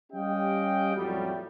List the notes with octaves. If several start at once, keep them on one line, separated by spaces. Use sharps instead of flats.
G3 C#4 G4 D#5 F5 G5
F2 A2 F#3 G3